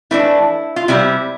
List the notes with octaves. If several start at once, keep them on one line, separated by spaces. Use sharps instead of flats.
E3 A3 D4 E4
F4
C3 G3 C4 E4